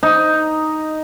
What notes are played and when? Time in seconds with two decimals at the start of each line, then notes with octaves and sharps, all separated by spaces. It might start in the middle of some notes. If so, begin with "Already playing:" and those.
0.03 D#4